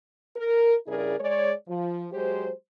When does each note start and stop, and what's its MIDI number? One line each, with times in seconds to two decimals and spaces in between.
0.36 0.75 70
0.87 1.16 43
0.87 1.16 49
0.87 1.16 64
0.87 1.16 68
0.87 1.16 70
0.87 1.16 74
1.20 1.53 56
1.20 1.53 73
1.20 1.53 74
1.68 2.07 53
2.12 2.51 54
2.12 2.51 56
2.12 2.51 67
2.12 2.51 72